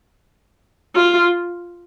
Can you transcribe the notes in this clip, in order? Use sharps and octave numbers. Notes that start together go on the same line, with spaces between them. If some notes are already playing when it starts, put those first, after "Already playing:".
F4